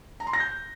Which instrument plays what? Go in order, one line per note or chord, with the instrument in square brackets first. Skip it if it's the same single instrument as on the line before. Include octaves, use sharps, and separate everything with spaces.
[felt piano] A#5
C6
A#6
G6